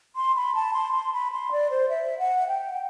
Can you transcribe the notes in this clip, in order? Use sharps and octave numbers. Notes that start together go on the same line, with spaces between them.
C6
B5
A5
C6
C6
B5
C6
D5
C5
E5
F#5
G5